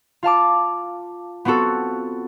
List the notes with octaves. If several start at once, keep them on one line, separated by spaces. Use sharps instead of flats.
F4 F5 A5 D6
B3 C4 F4 F#4 A4